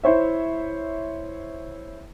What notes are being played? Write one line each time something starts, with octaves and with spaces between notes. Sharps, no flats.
E4 C5 C#5 E5